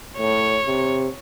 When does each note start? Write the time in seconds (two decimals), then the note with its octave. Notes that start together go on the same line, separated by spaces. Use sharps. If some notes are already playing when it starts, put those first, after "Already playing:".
0.19 A2 C#5
0.66 C3